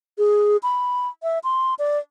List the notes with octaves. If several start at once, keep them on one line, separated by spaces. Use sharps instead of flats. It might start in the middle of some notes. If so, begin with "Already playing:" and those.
G#4
B5
E5
C6
D5